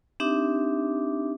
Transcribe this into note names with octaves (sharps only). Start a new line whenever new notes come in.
C4 D4 D#4 G4 E5 D6